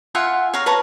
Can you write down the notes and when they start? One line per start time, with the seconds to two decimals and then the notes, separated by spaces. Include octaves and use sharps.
0.15 F4 E5 F#5 G#5
0.54 C#5 F5 A#5
0.66 B4 C#5 A5 A#5